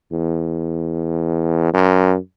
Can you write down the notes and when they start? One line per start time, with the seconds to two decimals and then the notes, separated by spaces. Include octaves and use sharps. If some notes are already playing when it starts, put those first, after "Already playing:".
0.12 E2
1.74 F#2